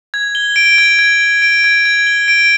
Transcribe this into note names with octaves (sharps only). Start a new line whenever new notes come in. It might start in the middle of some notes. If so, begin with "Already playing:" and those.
G#6
G7
D7
G#6
G#6
G7
D7
G#6
G#6
G7
D7